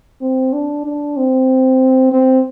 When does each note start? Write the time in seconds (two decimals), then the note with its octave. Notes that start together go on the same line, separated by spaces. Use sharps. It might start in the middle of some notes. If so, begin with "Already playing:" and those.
0.22 C4
0.53 D4
0.85 D4
1.17 C4
2.12 C4